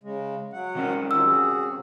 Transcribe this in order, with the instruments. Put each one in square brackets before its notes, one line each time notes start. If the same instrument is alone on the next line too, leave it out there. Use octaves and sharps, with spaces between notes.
[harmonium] C#3 G#3
F#3 F#5
[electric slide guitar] C3 C#4 A#4
[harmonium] D#3 F#3 F4 [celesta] E6
[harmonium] F#4 G#4